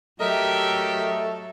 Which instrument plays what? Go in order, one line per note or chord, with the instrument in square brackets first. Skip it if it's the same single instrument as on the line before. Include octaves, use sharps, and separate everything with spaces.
[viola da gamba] F#3 A4 [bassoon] A3 [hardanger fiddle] G4 E5 [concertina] A#4 D#5